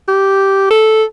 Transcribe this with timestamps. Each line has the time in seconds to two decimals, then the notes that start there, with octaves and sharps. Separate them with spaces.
0.08 G4
0.71 A4